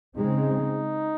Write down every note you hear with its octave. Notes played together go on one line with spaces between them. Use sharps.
C#3 G#3 C4 D#4